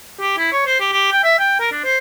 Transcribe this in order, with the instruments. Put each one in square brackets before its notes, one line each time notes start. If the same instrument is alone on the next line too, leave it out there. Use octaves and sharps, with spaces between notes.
[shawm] G4
E4
C#5
C5
G4
G4
G5
E5
G5
A#4
D4
C5